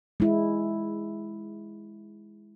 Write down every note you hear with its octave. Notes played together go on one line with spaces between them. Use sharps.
G#3 E4